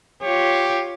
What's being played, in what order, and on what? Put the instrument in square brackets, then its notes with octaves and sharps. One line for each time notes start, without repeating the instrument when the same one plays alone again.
[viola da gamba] F4 C#5 [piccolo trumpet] G4